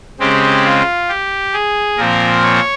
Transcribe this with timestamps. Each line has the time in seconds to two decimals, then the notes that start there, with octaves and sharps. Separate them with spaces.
0.19 C#3 G#3 C4 G4
0.64 F4
1.09 G4
1.54 G#4
1.97 A#2 F3 C4 A#4
2.43 C#5